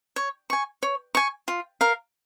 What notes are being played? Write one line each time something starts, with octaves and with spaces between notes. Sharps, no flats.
C#5
G#5 C#6
C#5
G#5 C#6
F4
A#4 F5